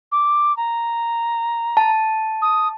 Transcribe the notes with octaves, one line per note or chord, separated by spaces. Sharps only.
D6
A#5
A5
D#6